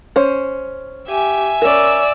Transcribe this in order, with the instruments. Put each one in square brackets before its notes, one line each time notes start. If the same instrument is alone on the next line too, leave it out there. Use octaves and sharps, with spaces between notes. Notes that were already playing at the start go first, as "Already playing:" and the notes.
[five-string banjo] C#4 C5
[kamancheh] G4 [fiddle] E5 G#5
[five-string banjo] C#4 A#4 [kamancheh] D5 E6